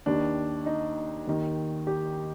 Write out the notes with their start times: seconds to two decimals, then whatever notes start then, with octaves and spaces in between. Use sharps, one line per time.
0.06 D#2 D#3 D4
0.66 D#4
1.27 D#2 D#3
1.87 G4